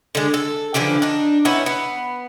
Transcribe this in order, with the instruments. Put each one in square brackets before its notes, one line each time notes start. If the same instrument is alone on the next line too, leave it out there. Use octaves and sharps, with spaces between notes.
[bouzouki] D3 G#3
A4
D3 E3 F3 G4
D4 D#4
B3 C#4 D#4 E4
B3